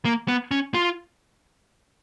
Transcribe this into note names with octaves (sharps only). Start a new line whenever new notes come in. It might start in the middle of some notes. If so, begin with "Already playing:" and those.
A#3
B3
C#4
F4